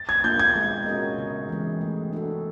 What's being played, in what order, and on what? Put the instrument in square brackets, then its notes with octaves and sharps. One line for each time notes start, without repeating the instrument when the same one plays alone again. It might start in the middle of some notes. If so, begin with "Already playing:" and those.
Already playing: [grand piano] A6
G#6
[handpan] A#3 D4 F4 [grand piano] G6
[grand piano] G#6
[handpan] G#3
C#4 F#4 A#4 D#5
C#3
E3 G#3
A3
D4 F#4 A4